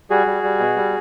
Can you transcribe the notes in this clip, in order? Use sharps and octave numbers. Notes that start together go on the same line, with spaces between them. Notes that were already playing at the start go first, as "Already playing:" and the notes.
G3 F#4 G#4
G3
G3
B2
G3